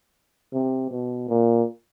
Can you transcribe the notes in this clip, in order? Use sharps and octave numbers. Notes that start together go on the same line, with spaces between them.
C3
B2
A#2